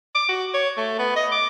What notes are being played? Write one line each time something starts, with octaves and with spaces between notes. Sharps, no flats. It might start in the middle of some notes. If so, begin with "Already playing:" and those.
D6
F#4
C#5
A3
B3
D#5
D6